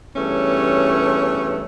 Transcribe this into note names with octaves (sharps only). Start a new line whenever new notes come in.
E2 G2 A3 C#4 C#5